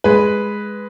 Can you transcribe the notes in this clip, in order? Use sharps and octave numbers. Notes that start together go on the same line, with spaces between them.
G#3 B4